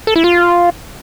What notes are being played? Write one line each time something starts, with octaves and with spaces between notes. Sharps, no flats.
A4
E4
F4